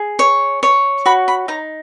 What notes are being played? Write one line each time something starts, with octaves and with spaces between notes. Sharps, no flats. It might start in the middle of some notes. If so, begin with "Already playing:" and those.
Already playing: G#4
C#5
C#5
F#4 B5
B5
D#4 A#5